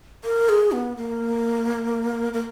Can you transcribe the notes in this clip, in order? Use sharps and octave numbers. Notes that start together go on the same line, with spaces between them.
A#4
G#4
B3
A#3
A#3